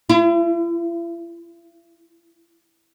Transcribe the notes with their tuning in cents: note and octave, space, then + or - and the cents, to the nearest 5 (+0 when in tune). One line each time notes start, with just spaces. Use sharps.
E4 +45